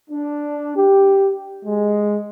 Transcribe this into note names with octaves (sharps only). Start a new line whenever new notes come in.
D4
G4
G#3